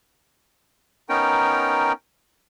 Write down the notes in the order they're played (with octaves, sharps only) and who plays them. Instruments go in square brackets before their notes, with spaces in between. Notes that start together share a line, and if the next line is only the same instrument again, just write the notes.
[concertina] B3 C#4 D#4 A#4 G5